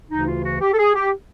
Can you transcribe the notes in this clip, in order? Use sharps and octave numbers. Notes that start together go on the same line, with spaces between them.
D2 C#3 E3 D#4
F4
F#4
G4
A4
G#4
G4